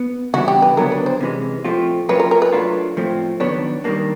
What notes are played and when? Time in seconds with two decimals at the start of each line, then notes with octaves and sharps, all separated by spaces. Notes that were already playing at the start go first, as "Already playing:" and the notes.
Already playing: B3
0.33 C#3 E3 G3 B3 D4 F#4
0.48 G4
0.62 B4
0.77 D3 F#3 B3 D4 A#4
0.92 B4
1.06 C5
1.21 C3 E3 G#3 C#4
1.64 A#2 F3 A3 C4 F4
2.09 F#3 A#3 C#4 F4 B4
2.20 A#4
2.31 A#4
2.42 B4
2.53 F#3 A3 D4 F4
2.97 A2 F3 A3 C4
3.40 D#3 F#3 B3 D4 C#5
3.84 D#3 G3 A#3 D4